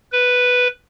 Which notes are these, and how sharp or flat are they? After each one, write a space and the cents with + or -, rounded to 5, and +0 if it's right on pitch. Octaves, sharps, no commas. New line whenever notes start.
B4 +0